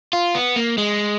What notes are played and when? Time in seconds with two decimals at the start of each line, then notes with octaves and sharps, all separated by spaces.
0.13 F4
0.35 B3
0.56 A#3
0.78 G#3